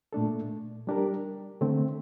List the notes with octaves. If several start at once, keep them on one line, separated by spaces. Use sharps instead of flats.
A#2 A3 D4 A4
G3 D4 G4 A#4
D3 A3 C4